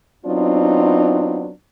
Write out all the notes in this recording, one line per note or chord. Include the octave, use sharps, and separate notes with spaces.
F#3 B3 C4 D4 D#4 F4